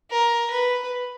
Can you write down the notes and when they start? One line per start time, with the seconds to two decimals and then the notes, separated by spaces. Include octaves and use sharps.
0.10 A#4
0.50 B4